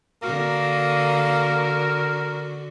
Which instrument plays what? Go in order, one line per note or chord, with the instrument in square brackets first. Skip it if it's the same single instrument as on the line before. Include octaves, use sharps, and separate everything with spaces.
[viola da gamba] D3 F#4 [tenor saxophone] A#3 [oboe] A#4